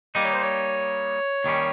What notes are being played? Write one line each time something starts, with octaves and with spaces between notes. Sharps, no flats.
G3 A#3 D#4 D#5
C#5
C5
C#5
D#2 D#3 G3 C#4